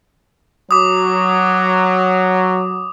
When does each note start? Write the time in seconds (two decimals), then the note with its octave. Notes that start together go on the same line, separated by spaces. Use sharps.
0.71 F#3 D6 D#6